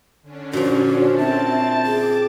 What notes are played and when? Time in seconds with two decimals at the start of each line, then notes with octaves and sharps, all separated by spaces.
0.22 D3 C#4 D4
0.53 A#2 F3 F#4
1.18 C4 E5 A5 A6
1.85 G#4 D6